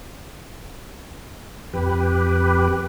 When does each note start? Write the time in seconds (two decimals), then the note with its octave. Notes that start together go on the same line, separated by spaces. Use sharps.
1.73 F2 G4 B4